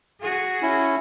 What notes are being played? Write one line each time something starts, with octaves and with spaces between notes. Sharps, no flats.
F#4 G#4
C#4 E4